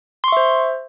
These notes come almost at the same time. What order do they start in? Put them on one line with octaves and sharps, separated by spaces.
C6 C#6 E5 C5